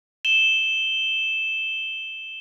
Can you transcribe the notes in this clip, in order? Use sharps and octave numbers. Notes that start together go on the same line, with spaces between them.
E7 G7